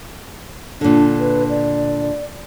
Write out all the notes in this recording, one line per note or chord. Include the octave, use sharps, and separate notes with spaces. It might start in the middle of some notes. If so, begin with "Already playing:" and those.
A#2 D3 D4
B4
D5